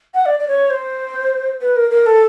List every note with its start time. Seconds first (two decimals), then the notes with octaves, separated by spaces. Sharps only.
0.14 F#5
0.26 D5
0.39 D5
0.48 C#5
0.70 C5
1.62 B4
1.76 A#4
1.90 A#4
2.06 A4